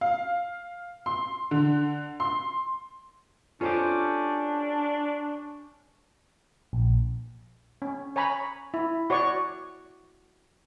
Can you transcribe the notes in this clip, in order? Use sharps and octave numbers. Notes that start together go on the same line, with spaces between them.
F5
C6
D3
C6
C#4 D4 F4 G4 A4 C5
A#1
C#4
C#5 G#5 A#5 B5
E4
F#4 C#5 D5 C#6